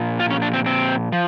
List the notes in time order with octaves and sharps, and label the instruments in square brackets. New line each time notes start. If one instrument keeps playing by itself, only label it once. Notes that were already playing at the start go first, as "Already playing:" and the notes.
Already playing: [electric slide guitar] A#2 F3
F4
C#4
D4
C4
C4
F3